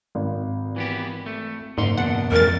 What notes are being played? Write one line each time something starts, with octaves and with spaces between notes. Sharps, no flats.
G#1
E3 B3 G4
A3
F#1 D2 G#2 F#5 C6
E2 B2 D4 F#5
F2 G#2 E3 F#3 A#4 A6